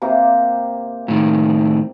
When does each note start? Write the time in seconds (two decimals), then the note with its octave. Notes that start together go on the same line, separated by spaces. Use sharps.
0.02 C3 A#3 A#5
1.08 A2 D#3